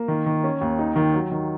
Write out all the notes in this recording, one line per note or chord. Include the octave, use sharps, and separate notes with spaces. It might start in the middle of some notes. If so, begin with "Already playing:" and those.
Already playing: A#3
D#3
D#3
C#4
D#2
D#4
D#3
F#3
D#3